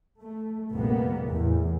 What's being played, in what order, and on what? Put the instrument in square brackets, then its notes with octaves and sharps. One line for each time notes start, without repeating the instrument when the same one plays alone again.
[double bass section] A3
F1 A#1 A#2 G3 A#3 B3
E2 A2